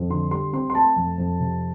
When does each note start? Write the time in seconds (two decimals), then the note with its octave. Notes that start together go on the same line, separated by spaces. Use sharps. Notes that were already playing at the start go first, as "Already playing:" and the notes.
Already playing: F2
0.10 D3 C6
0.31 G3 C6
0.53 C4 C6
0.70 C6
0.75 A3 A5
0.96 F2
1.18 F2
1.39 C3